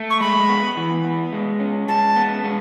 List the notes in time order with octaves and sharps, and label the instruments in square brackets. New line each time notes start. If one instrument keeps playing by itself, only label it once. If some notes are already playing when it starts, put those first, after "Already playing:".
Already playing: [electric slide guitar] A3
[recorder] C#6
[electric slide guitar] G#3 [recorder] B5
[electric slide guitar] B3
E3
B3
G#3
C#4
[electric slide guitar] G#3 [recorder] A5
[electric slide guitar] B3
G#3